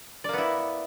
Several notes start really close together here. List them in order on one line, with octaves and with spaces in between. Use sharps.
D5 A#3 B3 E4